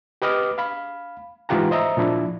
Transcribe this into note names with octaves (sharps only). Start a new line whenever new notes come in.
G4 B4 D#5 D6 F6
F5 B5
G#2 E3 F4 G4 F#5 A#5
C5 D#5 E5 A#5
A#2 F3 D4 E4